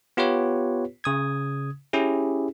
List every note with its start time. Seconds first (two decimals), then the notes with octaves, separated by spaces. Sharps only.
0.17 B3 F4 G4 B4 C#5
1.04 C#3 D#6 G#6
1.93 C#4 E4 G4 G#4